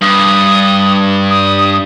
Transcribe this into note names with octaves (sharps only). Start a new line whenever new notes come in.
G2 D#6
D#6